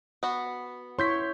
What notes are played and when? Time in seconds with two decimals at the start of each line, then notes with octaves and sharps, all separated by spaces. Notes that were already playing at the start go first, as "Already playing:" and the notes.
0.23 B3 F#4
0.99 E4 C#5 C6 G6 B6